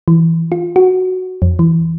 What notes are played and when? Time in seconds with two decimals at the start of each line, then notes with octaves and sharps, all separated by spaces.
0.08 E3
0.52 F4
0.76 F#4
1.42 F2
1.59 E3